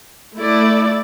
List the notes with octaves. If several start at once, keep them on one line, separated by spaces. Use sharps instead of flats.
A3 E4 D5